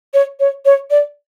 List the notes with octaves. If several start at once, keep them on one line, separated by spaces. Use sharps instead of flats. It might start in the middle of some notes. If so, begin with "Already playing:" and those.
C#5
C#5
C#5
D5